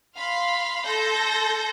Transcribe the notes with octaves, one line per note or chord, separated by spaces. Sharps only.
F5 B5 C6
A4 C6 G6 A#6